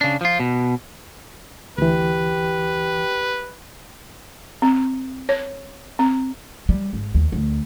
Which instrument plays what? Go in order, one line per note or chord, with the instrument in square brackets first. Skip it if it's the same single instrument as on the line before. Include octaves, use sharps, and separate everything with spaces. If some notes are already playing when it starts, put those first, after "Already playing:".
[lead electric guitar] C#3 D4
F3 F4
B2
[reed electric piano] D2 E3 [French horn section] G4 [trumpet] B4
[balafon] C4
C#5
C4
[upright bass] G3
G#1
D#2
D2